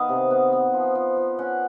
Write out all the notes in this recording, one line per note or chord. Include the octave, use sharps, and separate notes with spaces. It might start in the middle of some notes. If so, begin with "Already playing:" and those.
Already playing: D#3 B3 D#5 F5
C3
B3
B3
F3
F3
F3
C#4 F#5